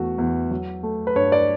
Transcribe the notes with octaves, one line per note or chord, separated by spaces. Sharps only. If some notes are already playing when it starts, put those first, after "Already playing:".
Already playing: E2 A3 F#4
E2
F#3
A3
B4
G2 C#5
D5